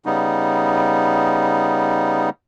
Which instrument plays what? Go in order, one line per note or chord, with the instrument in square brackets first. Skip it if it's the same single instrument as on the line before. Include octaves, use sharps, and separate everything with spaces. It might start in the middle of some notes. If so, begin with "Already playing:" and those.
[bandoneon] C#3 G3 B3 D#4